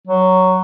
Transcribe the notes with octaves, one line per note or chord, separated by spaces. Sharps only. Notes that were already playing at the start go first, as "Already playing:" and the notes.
F#3